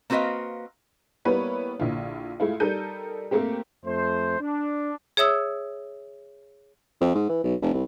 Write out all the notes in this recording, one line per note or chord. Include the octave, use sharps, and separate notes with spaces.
A#3 C4 F#4 B4 D#5 F5
G3 A#3 B3 E4 B4 C#5
A#1 D3 E4 F4
G#3 A3 E4 F4
G3 D#4 A4 A#4 G6 D#7
A3 A#3 C4 G4
F2 A3 C5
D4
G#4 C#5 E5 D#6 E6
F2
G#2
E3
B1
F1
C2